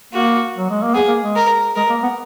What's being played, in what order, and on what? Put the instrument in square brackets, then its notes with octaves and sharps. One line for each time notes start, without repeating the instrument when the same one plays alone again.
[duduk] A#3 [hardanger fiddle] F#4
[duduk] F#3
G#3
A#3
[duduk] B3 [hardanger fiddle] G#4
[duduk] A#3
G#3
[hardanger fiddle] A#4
[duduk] G#3 [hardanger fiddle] A#4
[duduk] A#3
B3